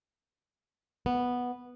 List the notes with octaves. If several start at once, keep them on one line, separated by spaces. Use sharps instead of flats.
B3